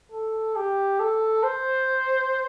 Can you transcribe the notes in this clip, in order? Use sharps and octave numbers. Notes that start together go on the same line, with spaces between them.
A4
G4
A4
C5